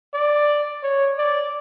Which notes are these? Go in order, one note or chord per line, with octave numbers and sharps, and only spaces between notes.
D5
C#5
D5